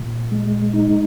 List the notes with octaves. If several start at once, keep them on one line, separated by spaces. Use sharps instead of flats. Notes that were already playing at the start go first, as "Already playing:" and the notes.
Already playing: A#2
G#3
D#4